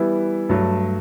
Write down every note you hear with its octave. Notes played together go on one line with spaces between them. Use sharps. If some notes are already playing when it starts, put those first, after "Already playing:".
Already playing: E3 G3 B3 E4
G2 F#3 A3